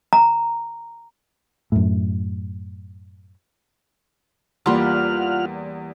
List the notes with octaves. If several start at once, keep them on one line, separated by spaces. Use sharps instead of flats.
A#5
F#2 A2
E2 G3 A#3 F4 F#5 C6 F6